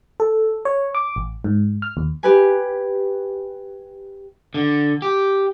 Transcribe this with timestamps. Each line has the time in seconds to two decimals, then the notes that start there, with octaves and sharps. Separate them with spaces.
0.20 A4
0.65 C#5
0.95 D6
1.16 A1
1.44 G#2
1.82 F6
1.97 D#2
2.23 G4 B4 G#5
4.54 D3
5.02 G4